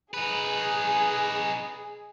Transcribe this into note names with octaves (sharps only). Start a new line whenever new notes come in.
D#4 G#4 B4